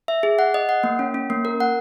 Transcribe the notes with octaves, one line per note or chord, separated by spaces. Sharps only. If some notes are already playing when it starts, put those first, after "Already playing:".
E5
G#4
F#5
D#5
F#5
A#3
C#4
C#4
A#3
A#4
F#5